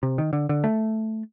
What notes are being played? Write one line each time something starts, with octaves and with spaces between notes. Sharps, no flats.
C3
D#3
D3
D3
A3